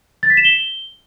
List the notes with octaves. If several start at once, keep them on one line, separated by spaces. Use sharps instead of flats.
A6
B6
E7
G7